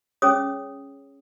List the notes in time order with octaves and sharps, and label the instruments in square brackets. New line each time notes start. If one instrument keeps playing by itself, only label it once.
[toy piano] C#4 G#4 C#5 D#6